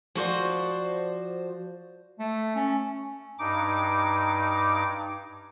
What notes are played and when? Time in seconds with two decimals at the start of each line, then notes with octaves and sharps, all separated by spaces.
0.15 F3 F#4 C5 D5
2.19 A3
2.56 C#4
3.39 G2 D#4 D6